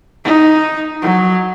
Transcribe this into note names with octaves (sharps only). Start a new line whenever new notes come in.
D#4
F#3